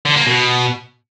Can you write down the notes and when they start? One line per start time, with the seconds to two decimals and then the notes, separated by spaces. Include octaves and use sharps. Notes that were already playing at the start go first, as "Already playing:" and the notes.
0.05 D3
0.16 A#3
0.27 B2